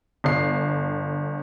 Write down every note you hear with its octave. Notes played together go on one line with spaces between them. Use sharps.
G1 C7